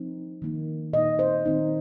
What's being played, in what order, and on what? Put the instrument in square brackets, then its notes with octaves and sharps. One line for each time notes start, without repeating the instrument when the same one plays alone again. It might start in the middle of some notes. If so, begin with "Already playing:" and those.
Already playing: [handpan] F3 C4 D#4
D#3 A#3 D#4
A#2 A#3 D#4 D#5
C5
D#3 C4 D#4